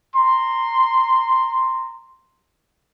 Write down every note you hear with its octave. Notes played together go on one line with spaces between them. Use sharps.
A#5 C6